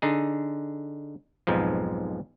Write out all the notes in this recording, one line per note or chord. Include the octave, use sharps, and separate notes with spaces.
D3 D#4 G#4
B1 F2 G#2 F3